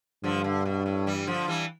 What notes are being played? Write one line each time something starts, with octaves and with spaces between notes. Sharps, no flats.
G2 D3 F3
D3
B2
A2
E3 G3
D3 F3
E3 G3